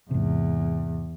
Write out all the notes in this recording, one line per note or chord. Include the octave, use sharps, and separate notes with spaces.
E2 G#2 C3